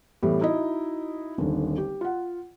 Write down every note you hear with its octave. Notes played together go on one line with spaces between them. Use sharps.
A2 E3 G3 B3
D#4 E4 F#4 D#5
D#1 G#1 D3
G4
F4 F#5